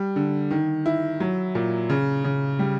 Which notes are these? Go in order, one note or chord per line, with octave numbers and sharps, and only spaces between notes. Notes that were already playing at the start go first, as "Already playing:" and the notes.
Already playing: G3
D3
D#3
E4
F#3
A#2
C#3
C#3
G3